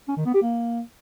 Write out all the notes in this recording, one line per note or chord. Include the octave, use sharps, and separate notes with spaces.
C#4
D#3
B3
G4
A#3